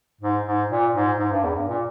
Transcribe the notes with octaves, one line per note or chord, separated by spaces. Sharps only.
G#2
G#2
A#2
G#2
G#2
G2
E2
G2
A#2